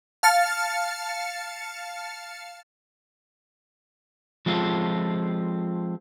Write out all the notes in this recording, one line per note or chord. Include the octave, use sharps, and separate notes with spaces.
F5 A5 F6 A6 C#7
F3 G#3 C4 F4 A4